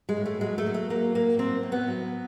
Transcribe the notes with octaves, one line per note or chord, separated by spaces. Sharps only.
G#3
A2
A3
F#3 G#3
A3
F#3
A3
F#3 A#3
A2 A#3
F#3 C4
A2
B3
F#3